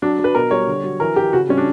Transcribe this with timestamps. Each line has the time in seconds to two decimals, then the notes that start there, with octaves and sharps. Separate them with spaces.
0.02 F#3 D4
0.19 F#3
0.24 B4
0.35 B2 A#4
0.51 G3 C#5
0.67 D3
0.84 F#3
1.00 E3 A#4
1.16 E3 G4
1.33 C#3 F#4
1.49 G3 C#4
1.57 D4